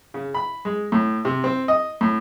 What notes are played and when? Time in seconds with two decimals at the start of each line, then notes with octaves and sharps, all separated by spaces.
0.14 C#3
0.34 B5
0.65 G#3
0.92 A2
1.25 C3
1.44 C4
1.68 D#5
2.01 A2